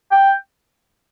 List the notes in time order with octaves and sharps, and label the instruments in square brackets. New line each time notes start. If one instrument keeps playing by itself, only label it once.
[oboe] G5